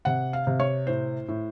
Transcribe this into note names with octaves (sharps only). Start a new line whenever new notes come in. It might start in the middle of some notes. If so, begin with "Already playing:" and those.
C3 F#5
F5
C3
C#5
A2 C5
A2